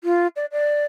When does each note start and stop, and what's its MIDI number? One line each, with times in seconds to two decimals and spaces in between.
0.04 0.27 65
0.36 0.45 74
0.52 0.85 74